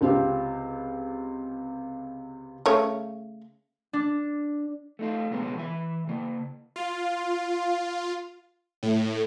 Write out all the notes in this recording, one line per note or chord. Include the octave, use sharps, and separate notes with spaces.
C#2 C3 C4 F4 G4
C#3 A3 C#5
D4
A3 D#4 F4
D2 B2 G#3 B3 C#4
E3 E5 G#5
C#3 A#3
F4
A2